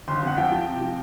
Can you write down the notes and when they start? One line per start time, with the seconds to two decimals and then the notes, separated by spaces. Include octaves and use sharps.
0.08 G1 C6
0.22 F2 F#5
0.37 F3 G5
0.52 F3
0.67 C3
0.81 F3